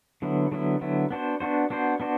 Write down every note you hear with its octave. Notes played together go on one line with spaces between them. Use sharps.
D3 F#3 B3 E4
D3 F#3 B3 E4
D3 F#3 B3 E4
B3 D4 F#4 C5
B3 D4 F#4 C5
B3 D4 F#4 C5
B3 D4 F#4 C5